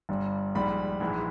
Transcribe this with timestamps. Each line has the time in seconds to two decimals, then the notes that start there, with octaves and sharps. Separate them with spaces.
0.09 G1 G2 G3
0.55 A#1 G#2 G3 B5
1.00 A#1 G#2 E3 G#3